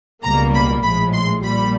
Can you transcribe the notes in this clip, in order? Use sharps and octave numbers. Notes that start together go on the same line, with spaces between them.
C#2 B2 G3 A#3 A#5
B5
A#1 A2 F3 G#3 B5
C6
A#1 A#2 G3 B5